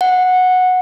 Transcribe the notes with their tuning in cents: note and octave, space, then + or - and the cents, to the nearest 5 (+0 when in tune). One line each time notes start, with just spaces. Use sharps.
F#5 -10